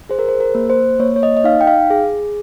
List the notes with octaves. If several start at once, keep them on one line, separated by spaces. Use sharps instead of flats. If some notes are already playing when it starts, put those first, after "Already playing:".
G#4 C5
A#4
C5
A#4
A#3
C5
A#3 C#5
C#5
D#5
D#5
D#4 F5
G5
F5
G#4